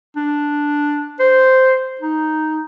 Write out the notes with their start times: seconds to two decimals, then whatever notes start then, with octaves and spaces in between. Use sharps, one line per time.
0.16 D4
1.20 C5
2.01 D#4